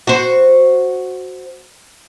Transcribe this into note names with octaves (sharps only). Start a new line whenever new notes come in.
F#4 C5